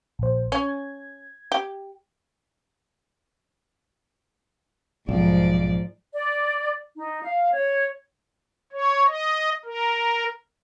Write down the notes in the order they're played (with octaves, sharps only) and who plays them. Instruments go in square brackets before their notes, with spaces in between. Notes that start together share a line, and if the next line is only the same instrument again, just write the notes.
[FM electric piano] A#1 C5
[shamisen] C#4 [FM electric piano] G#6
[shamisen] G4
[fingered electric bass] B1 [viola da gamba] G#2 F3 D5
[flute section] D5
D#4
F5
C#5
[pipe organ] C#5
D#5
A#4